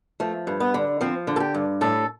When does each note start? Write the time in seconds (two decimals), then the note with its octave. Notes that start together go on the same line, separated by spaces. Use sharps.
0.20 F3 A3
0.47 G2
0.60 B3
0.74 D3
1.01 F3 C4
1.27 D3
1.36 A4
1.40 G4
1.54 G2
1.81 A2 A4